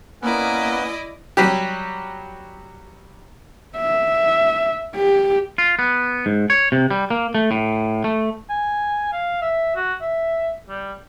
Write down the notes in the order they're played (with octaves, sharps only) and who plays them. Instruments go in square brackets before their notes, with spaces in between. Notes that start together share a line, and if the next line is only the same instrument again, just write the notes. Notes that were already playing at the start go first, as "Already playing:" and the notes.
[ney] A#3 [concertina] B3 C#4 B4 [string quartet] E4 D5 D#5
[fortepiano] F#3 G3 G4
[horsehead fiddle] E5
G4
[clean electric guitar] F4
B3
G#2
C#5
C3
G3
A#3
A3
A2
A3
[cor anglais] G#5
F5
E5
F#4
E5
G3